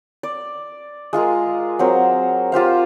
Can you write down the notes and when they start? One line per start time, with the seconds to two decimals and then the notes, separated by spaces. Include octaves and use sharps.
0.23 D5
1.13 G#3 F4 G#4 A#4
1.79 F#3 C4 A#4 C5
2.52 F4 G4 C5 F5